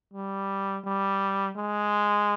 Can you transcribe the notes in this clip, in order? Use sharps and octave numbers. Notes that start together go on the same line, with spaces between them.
G3
G3
G#3